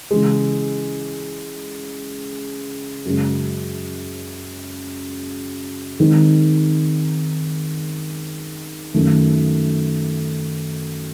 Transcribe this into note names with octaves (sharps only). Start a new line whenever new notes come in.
C#3 E3 G#3
F#2 C#3 G#3
D#3 G#3 C4 D#4
F#2 D#3 A3